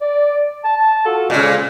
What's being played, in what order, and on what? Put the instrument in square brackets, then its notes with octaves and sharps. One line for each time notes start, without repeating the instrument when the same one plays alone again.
[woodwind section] D5
A5
F4 F#4 A4
[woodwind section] F2 G#3 [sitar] A#2 C#3